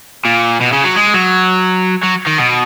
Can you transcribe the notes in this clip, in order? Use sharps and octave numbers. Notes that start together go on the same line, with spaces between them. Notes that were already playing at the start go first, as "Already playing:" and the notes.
A#2
B2
C#3
F#3
G#3
F#3
F#3
D#3
B2